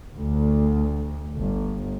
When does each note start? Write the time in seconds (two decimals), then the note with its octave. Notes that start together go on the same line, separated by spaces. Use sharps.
0.16 D2
1.37 G1